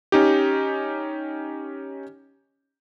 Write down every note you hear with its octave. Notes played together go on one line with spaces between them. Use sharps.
C#4 D#4 G4